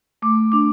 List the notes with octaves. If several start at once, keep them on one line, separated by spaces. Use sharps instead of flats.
A3 D6
D4 D6